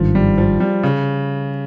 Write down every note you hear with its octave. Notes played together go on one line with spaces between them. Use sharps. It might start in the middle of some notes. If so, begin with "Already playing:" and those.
Already playing: G#1 G2 D#3 F3
G3
F3
G3
C#3